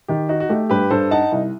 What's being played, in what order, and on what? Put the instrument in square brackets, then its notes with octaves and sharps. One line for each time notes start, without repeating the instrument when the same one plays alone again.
[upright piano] D#3 [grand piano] G4
[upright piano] D#4 [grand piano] F#4
[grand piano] F#4
[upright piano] A3 [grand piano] G4
[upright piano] G2 [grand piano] G4 B4
[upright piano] G2 [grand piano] A4 C5
[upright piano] D#4 [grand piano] F#5 A5
[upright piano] C2